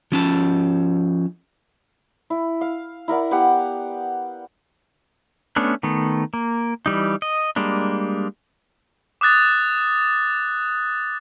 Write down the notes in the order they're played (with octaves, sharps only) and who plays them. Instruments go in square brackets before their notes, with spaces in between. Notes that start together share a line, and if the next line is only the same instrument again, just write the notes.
[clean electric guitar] F3 C#4 A5
[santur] E4
F5
E4 A#4 D5 F#5
B3 G4 F5 F#5
[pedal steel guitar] A3 B3 C#4 D4
D#3 A3 B3
A#3
E3 G3 D#4
D#5
G3 G#3 A#3 D4
[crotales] D6 D#6 F#6 A6